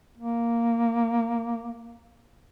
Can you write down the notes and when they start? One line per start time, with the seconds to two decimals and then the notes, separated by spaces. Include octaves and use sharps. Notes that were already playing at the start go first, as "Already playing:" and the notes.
0.17 A#3